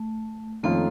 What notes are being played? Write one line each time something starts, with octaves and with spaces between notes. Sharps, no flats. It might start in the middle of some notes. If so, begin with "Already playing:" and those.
Already playing: A3
F2 D#3 A3 A#3 C#4 F4